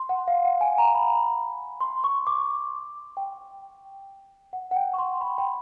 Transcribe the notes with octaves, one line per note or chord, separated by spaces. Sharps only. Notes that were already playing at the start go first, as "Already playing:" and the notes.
Already playing: C6
F#5
F5
F#5
G#5
A#5
B5
C6
C#6
D6
G5
F#5
F#5
G5
C#6
C6
B5
G5